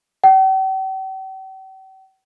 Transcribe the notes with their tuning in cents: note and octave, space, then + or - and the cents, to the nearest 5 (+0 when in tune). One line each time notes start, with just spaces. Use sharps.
G5 -45